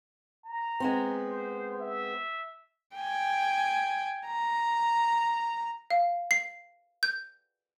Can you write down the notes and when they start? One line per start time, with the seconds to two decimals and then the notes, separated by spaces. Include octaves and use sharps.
0.45 A#5
0.80 G#3 B3 C4
1.29 C5
1.80 E5
2.95 G5 G#5
4.27 A#5
5.91 F5
6.31 C7
7.03 G6